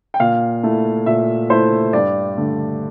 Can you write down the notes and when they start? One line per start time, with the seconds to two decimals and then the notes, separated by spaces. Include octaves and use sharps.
0.14 G5
0.20 A#2 F5
0.63 A3 E4
1.06 A#2 E5
1.50 A3 E4 C5
1.93 G2 D5
2.37 D3 A3